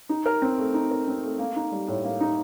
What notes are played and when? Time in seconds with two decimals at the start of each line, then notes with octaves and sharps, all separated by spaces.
0.09 D#4
0.26 A#4
0.42 C4
0.58 A3
0.74 D#4
0.91 A#4
1.07 C4
1.23 A3
1.39 A#3
1.56 D#4
1.71 G3
1.88 A2
2.04 A#3
2.20 D#4